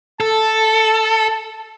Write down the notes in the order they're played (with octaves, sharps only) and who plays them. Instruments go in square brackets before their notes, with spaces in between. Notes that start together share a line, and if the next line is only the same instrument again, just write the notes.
[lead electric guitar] A4 [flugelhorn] A5